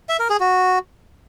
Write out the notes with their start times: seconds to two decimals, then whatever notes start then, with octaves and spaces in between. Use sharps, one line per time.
0.09 E5
0.19 A#4
0.30 G#4
0.40 F#4